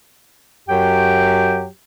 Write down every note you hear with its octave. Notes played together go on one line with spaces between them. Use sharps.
F#2 F#3 F#4 G4 G5